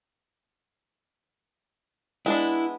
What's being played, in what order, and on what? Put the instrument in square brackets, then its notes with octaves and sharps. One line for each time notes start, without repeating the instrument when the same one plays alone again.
[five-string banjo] G#3 B3 D4 [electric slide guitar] E4